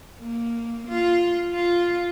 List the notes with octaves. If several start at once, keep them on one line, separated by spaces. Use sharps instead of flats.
A#3
F4
F4